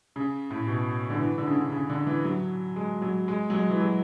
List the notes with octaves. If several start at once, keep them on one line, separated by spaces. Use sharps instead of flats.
C#3
A2
B2
D3
E3
D3
C#3
D3
C#3
D3
E3
F#3
G#3
F#3
G#3
F#3
G#3
E3
F#3